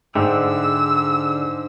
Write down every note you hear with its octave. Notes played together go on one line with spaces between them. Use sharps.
G#2 D3 G#4 E5 G5 E6